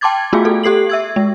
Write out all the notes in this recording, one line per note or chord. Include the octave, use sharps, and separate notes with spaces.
G5 A5 C6 D6 G#6 A6
A3 B3 F4 F#4 G#4
A4
G4 A4 C7 F#7
E5 E6 G#6
G#3